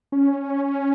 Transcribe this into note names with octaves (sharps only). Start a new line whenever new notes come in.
C#4